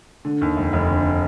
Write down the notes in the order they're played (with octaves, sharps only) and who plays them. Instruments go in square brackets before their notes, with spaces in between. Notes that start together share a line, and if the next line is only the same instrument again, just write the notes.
[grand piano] D3
D#2
F1
F1
D3